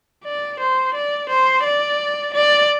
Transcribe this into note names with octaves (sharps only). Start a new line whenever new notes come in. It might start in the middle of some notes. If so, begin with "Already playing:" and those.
D5
C5
D5
C5
D5
D5